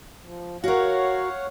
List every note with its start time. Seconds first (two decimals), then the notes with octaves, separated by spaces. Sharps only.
0.22 F3
0.64 F#4 A#4 C#5 F5 F#5